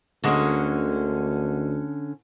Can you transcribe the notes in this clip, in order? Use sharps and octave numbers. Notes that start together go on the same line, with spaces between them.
D2 D3 G#3 A#3 C#4 F#4